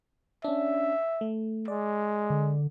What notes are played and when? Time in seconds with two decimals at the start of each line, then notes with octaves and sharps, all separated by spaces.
0.44 C#4 D4 E5
1.21 A3
1.68 G#3 D5
2.30 D3